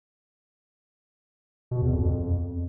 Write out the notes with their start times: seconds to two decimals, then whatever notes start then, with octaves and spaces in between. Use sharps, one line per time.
1.71 B2
1.82 E2
1.92 F2
2.03 F2